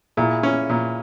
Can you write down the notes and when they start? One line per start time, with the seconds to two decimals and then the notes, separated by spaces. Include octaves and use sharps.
0.17 A#2 E4 G#4
0.43 C#4
0.69 A#2